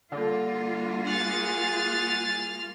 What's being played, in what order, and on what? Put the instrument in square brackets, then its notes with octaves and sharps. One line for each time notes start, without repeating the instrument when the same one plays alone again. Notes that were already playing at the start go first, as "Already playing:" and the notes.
[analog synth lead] D3 [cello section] G3 A#3 F4
[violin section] G#4 A6 [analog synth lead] F#5 [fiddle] F6